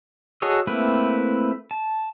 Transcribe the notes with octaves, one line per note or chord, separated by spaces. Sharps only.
F#4 G#4 A4 C#5 D#5
A3 A#3 C4 E4 B4
A5